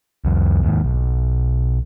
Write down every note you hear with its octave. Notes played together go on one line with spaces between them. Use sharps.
C2 F2
D#2 G#2
B1